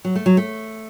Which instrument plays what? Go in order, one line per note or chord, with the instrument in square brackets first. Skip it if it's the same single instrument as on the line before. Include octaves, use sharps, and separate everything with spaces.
[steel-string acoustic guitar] F#3
A3
F#3
A3